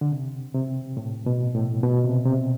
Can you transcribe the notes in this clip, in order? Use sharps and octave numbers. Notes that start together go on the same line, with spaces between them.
D3
C3
C3
A2
B2
A2
B2
C3
C3